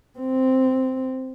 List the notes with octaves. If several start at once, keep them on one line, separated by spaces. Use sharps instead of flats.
C4